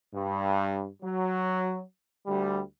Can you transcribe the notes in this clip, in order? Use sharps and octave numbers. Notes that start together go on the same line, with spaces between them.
G2
F#3
D2 G3